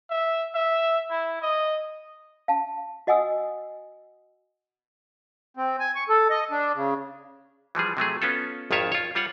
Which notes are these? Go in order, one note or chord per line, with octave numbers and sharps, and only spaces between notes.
E5
E5
E4
D#5
F5 A5
F#4 D#5 F#5 G#5 D#6 E6
C4
G#5
C#6
A4
D#5
D4
C#3
E3 F3 G3 G#4
C3 F#3 A3 G#4
B3 C#4 F4 A4
G#1 F2 D#3 F4 C#5 E5
F4 C#5
G3 F4 C#5 F#5